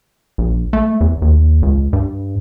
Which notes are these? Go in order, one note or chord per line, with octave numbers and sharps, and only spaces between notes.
A#1
A3
E2
D#2
C#2
G2